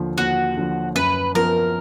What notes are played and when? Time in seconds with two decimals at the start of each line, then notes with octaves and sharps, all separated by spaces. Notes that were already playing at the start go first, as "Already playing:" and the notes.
Already playing: D#2 D3 F3
0.18 D#2 F#4
0.57 D3 F3
0.95 F#2 B4
1.35 F3 B3 A#4